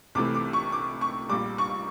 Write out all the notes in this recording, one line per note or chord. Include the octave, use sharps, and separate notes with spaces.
C2 C3 E3 A3 D6
D6
C#6
D6
C#6
A#1 A#2 G3 D6
C#6